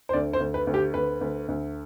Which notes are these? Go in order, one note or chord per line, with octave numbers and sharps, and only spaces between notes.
C5
D2 D5
C5
D2
B4
D2
G4
D2 B4
D2
D2